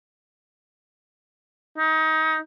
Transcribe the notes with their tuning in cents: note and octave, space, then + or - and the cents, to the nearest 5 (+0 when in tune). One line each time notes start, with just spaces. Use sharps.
D#4 +25